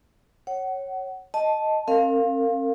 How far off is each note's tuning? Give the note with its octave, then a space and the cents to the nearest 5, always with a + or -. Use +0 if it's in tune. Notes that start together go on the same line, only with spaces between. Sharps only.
C#5 -10 F#5 +25
D#5 +0 A5 -5
C4 +35 A#4 -35 F5 +0